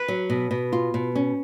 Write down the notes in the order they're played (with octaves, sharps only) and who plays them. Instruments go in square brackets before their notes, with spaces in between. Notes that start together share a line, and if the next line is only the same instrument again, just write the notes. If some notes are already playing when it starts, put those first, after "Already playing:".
Already playing: [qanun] B4
[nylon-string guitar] F#3
B2
B2
F4
B2
C#4